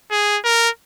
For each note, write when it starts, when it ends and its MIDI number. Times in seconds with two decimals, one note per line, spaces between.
0.11 0.39 68
0.44 0.70 70